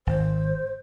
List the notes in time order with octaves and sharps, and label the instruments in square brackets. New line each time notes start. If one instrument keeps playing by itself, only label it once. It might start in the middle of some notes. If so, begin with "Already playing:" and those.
[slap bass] G#1 [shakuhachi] C5